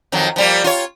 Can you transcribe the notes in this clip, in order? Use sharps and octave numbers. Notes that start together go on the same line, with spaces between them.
F2 D#3 F#3
F3 G3 A#3
F4 C#5